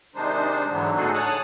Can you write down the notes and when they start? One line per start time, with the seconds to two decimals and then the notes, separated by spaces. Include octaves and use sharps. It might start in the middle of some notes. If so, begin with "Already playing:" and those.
0.15 C3 D#3 G#3 D4 D#4 C5
0.71 G#2 D3 E3 F#3 B3
0.97 A2 D3 D#4 F#4 G#4 A4
1.14 C#5 G#5 A5 D#6 F#6